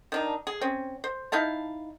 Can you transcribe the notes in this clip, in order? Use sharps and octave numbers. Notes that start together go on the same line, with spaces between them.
D#3 D4 D#4
G#4
C4 C#4
C5
D#4 E4 F5 A5